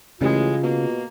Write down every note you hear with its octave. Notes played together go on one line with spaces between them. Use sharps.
A1 C#3 G#3 F4
B2 A#3